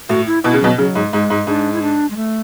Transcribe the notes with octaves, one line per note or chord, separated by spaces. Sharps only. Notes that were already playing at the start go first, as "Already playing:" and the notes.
A2 F#4
E4
B2 E4
C#3
B2 F#3
C#3 F#3
G#2
G#2 G#3
G#2
G#2 D4
E4
D4
G#3
A3